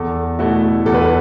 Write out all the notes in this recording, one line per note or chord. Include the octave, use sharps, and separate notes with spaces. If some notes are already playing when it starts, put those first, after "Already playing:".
Already playing: E2 A4
B2 A3 E4 F#4
E2 A4
B4
A4